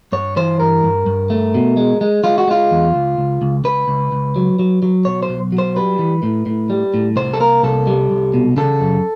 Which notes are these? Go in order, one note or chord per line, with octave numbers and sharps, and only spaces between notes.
G2 C#5
E3 C5
G2 A#4
G2
G2
A3
B2
G#3
G#3
G#3 F4
F#4
G#3 F4
E2
C#2
C#2
C#2
C#2 B4
C#2
C#2
F#3
F#3
F#3
B1 C#5
C5
B1
F#3
C5
G3 B4
E3
A2
A2
G3
A2
C2 C5
A4
A#3 A#4
C2 A4
G3
C2
B2
C#3 A4
F#2